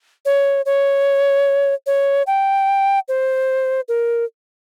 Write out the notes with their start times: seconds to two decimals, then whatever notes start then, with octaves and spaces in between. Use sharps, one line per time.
0.25 C#5
0.66 C#5
1.86 C#5
2.27 G5
3.08 C5
3.88 A#4